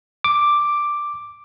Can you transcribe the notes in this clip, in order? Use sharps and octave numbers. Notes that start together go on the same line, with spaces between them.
D6